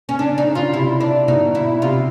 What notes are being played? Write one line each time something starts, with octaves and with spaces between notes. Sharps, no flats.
C#4
C#3 D4
D#4
C#3
F4
C3 E4
D4
B2 D#4
E4
C3 F4